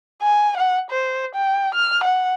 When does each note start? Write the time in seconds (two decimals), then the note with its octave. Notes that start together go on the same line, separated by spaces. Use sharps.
0.22 G#5
0.57 F#5
0.90 C5
1.35 G5
1.74 F6
2.03 F#5